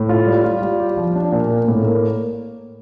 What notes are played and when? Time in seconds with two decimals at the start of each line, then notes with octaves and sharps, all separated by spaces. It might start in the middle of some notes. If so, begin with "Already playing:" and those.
Already playing: A2
0.09 F4
0.26 G3
0.44 F4
0.62 G3
0.80 G4
0.97 F3
1.15 D4
1.32 A#2
1.49 A#3
1.68 A2
1.84 A#3